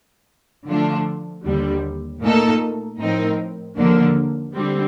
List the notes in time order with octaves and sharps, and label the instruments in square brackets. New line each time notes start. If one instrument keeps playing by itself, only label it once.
[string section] D3 F3 A3 D4 F4
D#2 D3 G3
A#2 A3 D#4 A4
A2 F3 C4 D#4 A#4
D#2 D3 F3 A#3 D4
D3 G3 C4